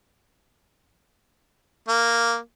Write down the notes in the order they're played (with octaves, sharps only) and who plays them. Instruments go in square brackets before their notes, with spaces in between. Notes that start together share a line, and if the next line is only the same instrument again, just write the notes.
[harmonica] A#3